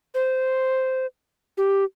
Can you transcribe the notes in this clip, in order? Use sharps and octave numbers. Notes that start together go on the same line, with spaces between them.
C5
G4